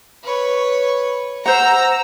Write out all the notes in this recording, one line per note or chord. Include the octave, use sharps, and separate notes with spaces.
B4 C#5
C5 F#5 A#5 E6